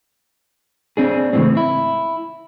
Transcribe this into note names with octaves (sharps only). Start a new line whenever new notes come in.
C4 D4 G#4
C#2 A2 C3 E3 C4
E4